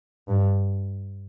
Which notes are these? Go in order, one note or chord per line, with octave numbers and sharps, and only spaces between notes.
G2